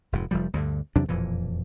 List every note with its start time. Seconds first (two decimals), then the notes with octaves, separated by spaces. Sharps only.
0.12 F1 G#2
0.31 F1 F3 G3
0.53 D2 G2 D3
0.96 E2 C3 F#3 D4
1.09 E1 F2 A#2 E3